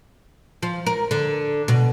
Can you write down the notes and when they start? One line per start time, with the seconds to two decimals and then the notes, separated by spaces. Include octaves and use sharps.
0.63 F3
0.86 A#4
1.11 D3
1.68 B2